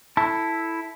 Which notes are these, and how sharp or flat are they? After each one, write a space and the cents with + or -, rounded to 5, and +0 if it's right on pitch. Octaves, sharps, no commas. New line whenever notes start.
E4 +0 A4 +0 A5 +0